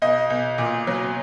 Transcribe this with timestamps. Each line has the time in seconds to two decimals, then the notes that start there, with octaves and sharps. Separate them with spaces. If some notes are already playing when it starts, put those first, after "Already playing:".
0.02 B1 D#5
0.30 B1
0.58 A#2
0.87 F#3